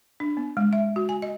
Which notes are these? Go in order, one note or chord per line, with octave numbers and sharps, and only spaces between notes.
D4
B3
G#3
E5
F#4
G#5
D#5